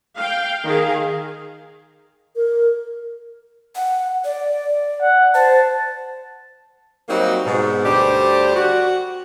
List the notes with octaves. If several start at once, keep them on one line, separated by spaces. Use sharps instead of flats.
F5 G5
D#3 G#4 F5
A#4
F#5
D5
F#5
C5 A5
F#3 G3 A#3 C4 D#4 F#4
G#2 B2
D2 G3 D4 G4 C5 D5
F#4